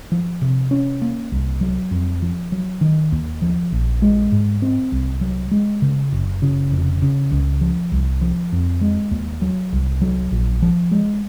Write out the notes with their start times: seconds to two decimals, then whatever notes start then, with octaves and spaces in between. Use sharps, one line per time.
0.12 F3
0.42 C3
0.71 C#4
1.02 A#3
1.32 C2
1.61 F#3
1.91 F2
2.22 F3
2.52 F#3
2.81 D#3
3.12 D#2
3.42 F3
3.72 A#1
4.02 G#3
4.32 G#2
4.62 C4
4.92 C2
5.21 F#3
5.51 G#3
5.82 C#3
6.12 F#1
6.42 C#3
6.72 F1
7.02 C#3
7.31 C#2
7.61 F3
7.92 C2
8.21 F3
8.52 F2
8.81 G#3
9.11 D#2
9.42 F#3
9.73 C2
10.02 F#3
10.31 A#1
10.62 F3
10.91 G#3